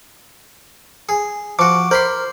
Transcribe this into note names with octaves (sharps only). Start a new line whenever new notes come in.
G#4
F3 F#4 D6
A#4 C5 B5 C6